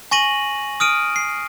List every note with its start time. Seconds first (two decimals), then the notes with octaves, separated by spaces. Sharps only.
0.11 G#5 C#6 A#6 D#7 F#7
0.80 D#6 F6 D7 D#7
1.16 C7